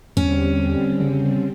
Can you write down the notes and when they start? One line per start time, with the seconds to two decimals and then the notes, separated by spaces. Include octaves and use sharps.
0.17 E2 D3 G3 C4 C#4
1.00 C#3